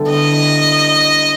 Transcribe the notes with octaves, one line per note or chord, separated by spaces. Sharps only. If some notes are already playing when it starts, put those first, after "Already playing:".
Already playing: D3 G3 B3 E4 A4
D#5